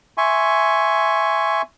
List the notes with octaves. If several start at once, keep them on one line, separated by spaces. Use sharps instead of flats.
E5 G#5 C6 C#6